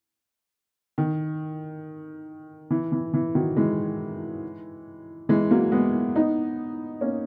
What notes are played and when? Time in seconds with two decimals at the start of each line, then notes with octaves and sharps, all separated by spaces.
0.98 D#3
2.71 E3
2.92 E3
3.14 E3
3.35 D#3 F#3
3.57 E3 G#3
5.29 E3 G#3
5.51 F#3 A#3
5.72 G#3 B3
6.15 B3 D#4
7.01 A#3 C#4